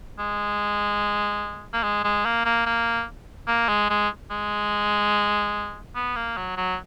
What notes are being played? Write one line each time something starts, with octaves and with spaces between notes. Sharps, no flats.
G#3
A#3
G#3
G#3
A#3
A#3
A#3
A#3
G#3
G#3
G#3
B3
A#3
F#3
F#3